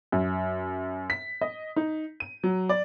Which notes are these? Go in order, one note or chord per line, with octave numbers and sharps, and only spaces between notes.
F#2
B6
D#5
D#4
D#7
F#3
D5